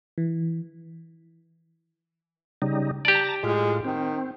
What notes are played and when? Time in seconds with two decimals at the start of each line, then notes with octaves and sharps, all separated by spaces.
0.18 E3
2.62 C#3 G3 D#4
3.05 G4 D5 A5 A#5
3.43 A2 G#3 F4
3.85 D#3 C4